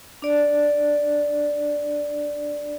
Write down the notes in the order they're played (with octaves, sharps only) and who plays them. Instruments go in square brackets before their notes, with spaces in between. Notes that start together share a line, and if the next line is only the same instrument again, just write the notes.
[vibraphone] D4 D5